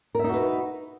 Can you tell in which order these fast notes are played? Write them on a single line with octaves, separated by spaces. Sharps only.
A#4 E5 D#4 F#4 B4